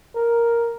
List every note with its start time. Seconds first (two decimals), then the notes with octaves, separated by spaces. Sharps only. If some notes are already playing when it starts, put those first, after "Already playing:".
0.15 A#4